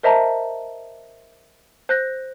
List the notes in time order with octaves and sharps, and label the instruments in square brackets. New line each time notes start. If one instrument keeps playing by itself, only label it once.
[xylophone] A#4 C5 D#5 E5 A5 A#5
C5 F#6 A#6